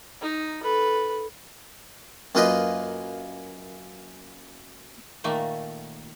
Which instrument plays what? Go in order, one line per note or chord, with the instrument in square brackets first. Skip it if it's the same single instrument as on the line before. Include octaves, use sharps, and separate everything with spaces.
[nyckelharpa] D#4
A4 B4
[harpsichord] F#2 A#3 F4 B4 D#5 C6
[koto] A#2 D#3 A3 A#3